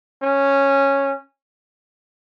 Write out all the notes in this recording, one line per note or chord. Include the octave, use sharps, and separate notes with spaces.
C#4